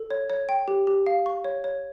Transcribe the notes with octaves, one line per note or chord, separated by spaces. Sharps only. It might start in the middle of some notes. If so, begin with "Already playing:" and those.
Already playing: A4
C#5
C#5
G5
G4
G4
F5
C#6
C#5
C#5